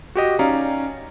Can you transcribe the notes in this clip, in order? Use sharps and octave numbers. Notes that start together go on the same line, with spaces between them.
F#4 G4 D#5
C#4 D#4 D5 F5 A#5